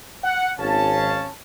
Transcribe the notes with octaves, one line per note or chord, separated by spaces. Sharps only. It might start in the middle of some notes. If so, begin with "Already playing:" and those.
F#5
G#1 C#4 F5 A5